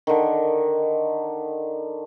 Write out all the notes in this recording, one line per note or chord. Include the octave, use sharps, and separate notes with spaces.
D3 D#3